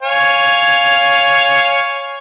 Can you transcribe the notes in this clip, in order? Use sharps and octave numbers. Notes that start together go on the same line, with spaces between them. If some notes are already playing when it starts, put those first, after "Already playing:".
C#5 F5 G#5